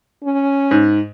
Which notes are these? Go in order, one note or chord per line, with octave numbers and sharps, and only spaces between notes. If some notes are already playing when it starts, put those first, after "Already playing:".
C#4
G#2